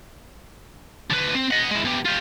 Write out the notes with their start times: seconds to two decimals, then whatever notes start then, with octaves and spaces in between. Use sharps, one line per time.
1.10 D3 B4
1.35 C4
1.51 D#5 F#5
1.71 G#3 E4
1.85 B2 G4
2.05 F4 G4